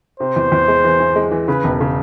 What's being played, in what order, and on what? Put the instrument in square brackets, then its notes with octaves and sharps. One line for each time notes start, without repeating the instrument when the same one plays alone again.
[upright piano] C3 [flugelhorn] C5
[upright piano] E2
E2
G#3
E3
E3
G#3
E3
[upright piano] C#3 [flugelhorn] B4
[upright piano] E1
C#3